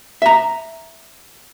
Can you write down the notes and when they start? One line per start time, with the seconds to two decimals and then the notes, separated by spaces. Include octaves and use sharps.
0.22 E5 A#5